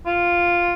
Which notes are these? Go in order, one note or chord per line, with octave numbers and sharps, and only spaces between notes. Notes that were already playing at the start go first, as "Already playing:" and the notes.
F4